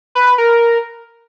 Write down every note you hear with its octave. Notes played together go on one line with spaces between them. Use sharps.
B4
B4
A#4